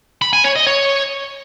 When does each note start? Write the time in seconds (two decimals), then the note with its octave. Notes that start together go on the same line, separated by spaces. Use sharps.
0.22 B5
0.33 G#5
0.44 C#5
0.56 D#5
0.67 C#5